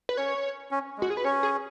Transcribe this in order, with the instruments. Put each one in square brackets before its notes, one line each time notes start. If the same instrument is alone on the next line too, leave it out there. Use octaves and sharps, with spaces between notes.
[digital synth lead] B4
[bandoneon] C#4 [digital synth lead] C#5
[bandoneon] C#4
G#3
[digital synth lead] F#4
G#4
B4
[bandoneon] C#4 [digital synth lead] C#5
[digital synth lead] G#4